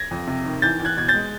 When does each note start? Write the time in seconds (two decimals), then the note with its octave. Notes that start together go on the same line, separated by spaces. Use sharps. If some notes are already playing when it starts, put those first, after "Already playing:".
Already playing: G#6 A#6
0.11 F2
0.27 C3
0.46 D#3
0.62 E2 G6 A6
0.79 E2
0.85 F#6 G#6
0.97 B2 G#6
1.08 G6 A6
1.14 G#3